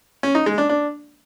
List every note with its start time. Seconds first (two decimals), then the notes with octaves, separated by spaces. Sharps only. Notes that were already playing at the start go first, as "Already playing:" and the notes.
0.23 C#4
0.35 D#4
0.46 G#3
0.58 D4
0.69 D4